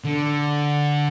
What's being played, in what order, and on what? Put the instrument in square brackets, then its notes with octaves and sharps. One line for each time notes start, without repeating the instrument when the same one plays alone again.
[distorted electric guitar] D3